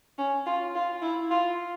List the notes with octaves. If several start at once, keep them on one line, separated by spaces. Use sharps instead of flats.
C#4
F4
F4
E4
F4